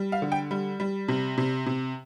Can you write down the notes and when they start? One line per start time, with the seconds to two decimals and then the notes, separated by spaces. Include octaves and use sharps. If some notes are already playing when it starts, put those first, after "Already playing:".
Already playing: G3
0.12 F5
0.22 D3
0.32 G5
0.51 G3
0.80 G3
1.08 C3
1.38 C3
1.66 C3